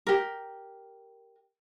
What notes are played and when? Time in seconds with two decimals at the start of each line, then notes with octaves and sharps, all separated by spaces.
0.07 G4 A#4